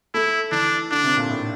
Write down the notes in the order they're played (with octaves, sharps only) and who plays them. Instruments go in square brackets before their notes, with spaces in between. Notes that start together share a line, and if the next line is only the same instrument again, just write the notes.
[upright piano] A3 [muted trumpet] E4
[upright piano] E3 [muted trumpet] D4
[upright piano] D3 [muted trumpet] D4
[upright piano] C3
A#2
A2